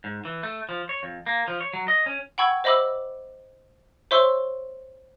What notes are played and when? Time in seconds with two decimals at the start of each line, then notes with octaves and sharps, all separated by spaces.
0.04 G#2
0.25 E3
0.43 A3
0.69 F3
0.89 C#5
1.03 F2
1.26 A#3
1.48 F3
1.61 C#5
1.73 F#3
1.88 D#5
2.06 C#4
2.38 F#5 G5 B5 C#6 E6 G#6
2.64 C5 D#5 E5 B5 D6 E6
4.11 C5 C#5 E5 C6 C#6 E6